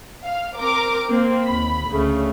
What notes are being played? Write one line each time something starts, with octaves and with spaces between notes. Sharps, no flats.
F5
C4 A#4 D6
A#3 C4
D#2 B5
D2 C#3 A3